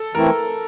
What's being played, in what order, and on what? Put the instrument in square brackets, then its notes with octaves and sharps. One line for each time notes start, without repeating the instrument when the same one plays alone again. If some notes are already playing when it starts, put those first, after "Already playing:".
Already playing: [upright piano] A4
[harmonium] E3 A3 C4 E4 [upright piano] A#4